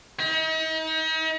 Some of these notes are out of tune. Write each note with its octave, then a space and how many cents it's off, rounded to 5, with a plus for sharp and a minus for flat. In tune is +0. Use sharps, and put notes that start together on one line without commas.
D#4 +40